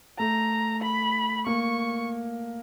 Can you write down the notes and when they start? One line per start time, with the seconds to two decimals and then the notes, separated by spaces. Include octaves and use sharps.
0.18 A3 A#5
0.82 B5
1.46 A#3 C#6